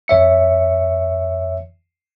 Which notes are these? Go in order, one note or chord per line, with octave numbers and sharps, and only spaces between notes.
F2 C#5 E5 C#7